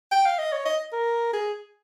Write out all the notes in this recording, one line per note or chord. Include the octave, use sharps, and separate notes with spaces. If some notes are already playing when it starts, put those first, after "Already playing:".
G5
F5
D#5
C#5
D#5
A#4
G#4